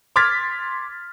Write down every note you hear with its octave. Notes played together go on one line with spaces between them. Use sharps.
C6 D6 F6 G#6 A6 B6